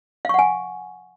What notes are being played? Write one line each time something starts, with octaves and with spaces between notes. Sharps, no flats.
F5 F#5 G#5 C#6